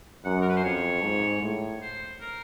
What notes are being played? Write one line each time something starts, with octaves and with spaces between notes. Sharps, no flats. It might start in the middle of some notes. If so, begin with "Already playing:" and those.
F#2 F#5
A#4
B4
C5
F2 C#5
G#2
A2
C5
A#4